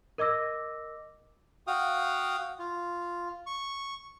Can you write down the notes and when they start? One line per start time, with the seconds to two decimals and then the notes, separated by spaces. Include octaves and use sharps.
0.18 A#4 D#5 D6 E6 A#6
1.67 F#4 F5 G5 D#6
2.59 F4
3.46 C#6